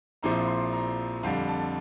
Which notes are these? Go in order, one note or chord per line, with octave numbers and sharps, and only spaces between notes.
A#1 A#2 F3 C4 E4 A#5
C6
A#5
F2 D3 G3 F5
A5